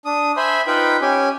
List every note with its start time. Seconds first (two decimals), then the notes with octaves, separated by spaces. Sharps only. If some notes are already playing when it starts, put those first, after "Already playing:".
0.05 D4 D#6
0.37 C5 E5 G#5 B5 C6
0.67 D#4 F4 B4 G5 B5
1.02 C#4 G4 G#5